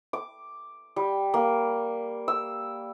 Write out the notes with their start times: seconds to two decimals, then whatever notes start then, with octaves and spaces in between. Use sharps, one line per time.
0.13 D6
0.96 G3
1.34 A#3
2.28 E6